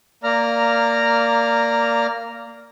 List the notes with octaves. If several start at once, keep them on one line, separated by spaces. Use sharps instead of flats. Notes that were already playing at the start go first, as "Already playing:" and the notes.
A#3 D5 A#5 F6